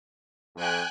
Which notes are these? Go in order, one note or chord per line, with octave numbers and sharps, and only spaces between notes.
F2 G5 G#5 F#6